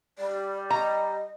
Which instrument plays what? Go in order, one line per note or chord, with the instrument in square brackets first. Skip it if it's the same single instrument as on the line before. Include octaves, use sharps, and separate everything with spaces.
[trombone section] G3 [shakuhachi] D5
[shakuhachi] D#5 [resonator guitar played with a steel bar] A#5